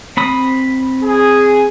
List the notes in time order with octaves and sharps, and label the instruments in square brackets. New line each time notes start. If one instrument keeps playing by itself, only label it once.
[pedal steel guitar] C4 B5 D#6
[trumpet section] G#4